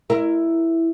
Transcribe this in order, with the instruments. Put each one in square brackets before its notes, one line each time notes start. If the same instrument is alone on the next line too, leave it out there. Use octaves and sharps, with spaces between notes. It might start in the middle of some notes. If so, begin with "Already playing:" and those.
[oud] E4 A#4